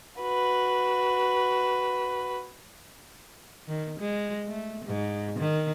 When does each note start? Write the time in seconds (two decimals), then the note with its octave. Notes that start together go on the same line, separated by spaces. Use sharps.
0.20 F#4 B4
3.68 D#3
3.99 G#3
4.48 A3
4.85 G#2
5.39 D#3